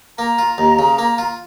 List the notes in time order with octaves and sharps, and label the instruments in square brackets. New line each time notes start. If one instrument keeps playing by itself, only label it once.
[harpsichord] A#3 [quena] A#5
[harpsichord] F4
D#2
C#3
A#3
F4